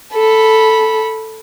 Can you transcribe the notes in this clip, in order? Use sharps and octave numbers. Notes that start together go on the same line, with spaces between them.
A4 B5